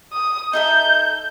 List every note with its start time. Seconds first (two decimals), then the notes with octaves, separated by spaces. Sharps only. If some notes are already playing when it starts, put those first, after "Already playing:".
0.12 D#6
0.53 D#4 A4 E5 G6